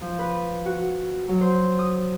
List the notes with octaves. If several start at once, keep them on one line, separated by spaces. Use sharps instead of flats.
F3
B4
F#4
F#3
C5
D#6